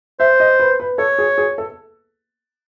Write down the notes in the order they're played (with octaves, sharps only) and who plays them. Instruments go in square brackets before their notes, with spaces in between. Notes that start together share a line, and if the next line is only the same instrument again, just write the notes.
[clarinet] C5 [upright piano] E5
[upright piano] D#5
B4
B4
[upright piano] A4 [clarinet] C#5
[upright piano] G#4
G#4
A4